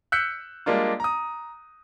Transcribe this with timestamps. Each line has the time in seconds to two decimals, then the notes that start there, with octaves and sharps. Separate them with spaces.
0.12 E6 F#6 G6 B6 C#7
0.66 G3 G#3 A#3 D4 F4
1.00 A#5 D#6